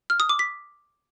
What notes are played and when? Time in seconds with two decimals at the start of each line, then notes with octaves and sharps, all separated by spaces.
0.10 F6
0.20 D#6
0.29 D6
0.39 B6